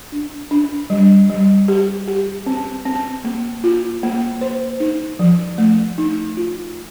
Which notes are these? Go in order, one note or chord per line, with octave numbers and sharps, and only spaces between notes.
D4
D4
G3
G3
G4
G4
C4
C4
A#3
F4
A#3
C5
D#4
F3
A3
D#4
F4